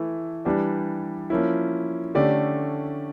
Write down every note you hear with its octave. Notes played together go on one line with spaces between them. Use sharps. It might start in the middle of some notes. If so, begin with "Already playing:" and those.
Already playing: E3 A3 E4
E3 G3 D4 G4 D5
F3 A#3 C#4 E4
D3 A3 C#4 G4 D5